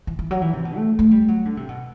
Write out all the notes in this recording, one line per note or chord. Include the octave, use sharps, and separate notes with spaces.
E3
E3
F#3
E3
C3
B2
A3
A3
G3
F#3
D3
C3
B2